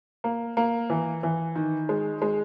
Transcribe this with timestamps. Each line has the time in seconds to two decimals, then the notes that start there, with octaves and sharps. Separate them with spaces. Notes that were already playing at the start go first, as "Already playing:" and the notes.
0.24 A#3
0.57 A#3
0.90 E3
1.23 E3
1.56 D#3
1.89 G#3
2.22 G#3